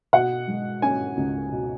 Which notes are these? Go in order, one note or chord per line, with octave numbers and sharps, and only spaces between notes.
B2 F#5
G#3
C#4 G#5
C#2
B2